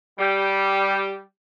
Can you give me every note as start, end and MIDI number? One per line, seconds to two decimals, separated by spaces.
0.18 1.21 55
0.18 1.21 67